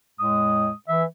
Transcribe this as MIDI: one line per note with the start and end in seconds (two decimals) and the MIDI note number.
0.20 0.70 40
0.20 0.70 45
0.20 0.70 56
0.20 0.73 87
0.89 1.04 52
0.89 1.03 76